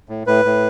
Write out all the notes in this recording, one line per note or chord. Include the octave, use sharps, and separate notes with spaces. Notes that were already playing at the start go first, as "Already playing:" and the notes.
A2
A2 B4
A2